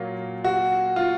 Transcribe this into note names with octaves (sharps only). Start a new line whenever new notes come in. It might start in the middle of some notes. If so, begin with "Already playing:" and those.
Already playing: A#2 F#3 A#3 F4
F#4
F4